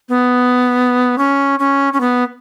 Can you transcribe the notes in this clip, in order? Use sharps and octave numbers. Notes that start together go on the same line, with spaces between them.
B3
C#4
C#4
C#4
B3